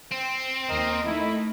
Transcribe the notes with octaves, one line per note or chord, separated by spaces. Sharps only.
C4
D#2 A#4 D#5
A3 D#4 E4